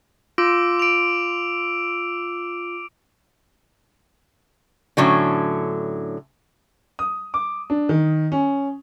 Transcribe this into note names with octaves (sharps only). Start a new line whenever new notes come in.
F4 D6 E6 D7
D7 F7
A2 D3 F#3 C#4
D#6
D6
D4
D#3
C#4